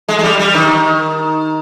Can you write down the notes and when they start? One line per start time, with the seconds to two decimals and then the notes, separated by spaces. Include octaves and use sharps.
0.09 G#3
0.19 G#3
0.23 G3
0.39 G3
0.54 D#3